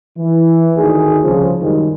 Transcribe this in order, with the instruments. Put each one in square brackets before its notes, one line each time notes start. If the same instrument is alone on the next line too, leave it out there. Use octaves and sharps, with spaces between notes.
[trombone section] E3
D2 D#3 G#4
C2 C#3 F3
F#2 D#3 G3 G#3